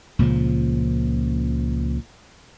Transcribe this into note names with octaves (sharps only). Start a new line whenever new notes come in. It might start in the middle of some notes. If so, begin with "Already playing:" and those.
C#2 A#2 C#3 F3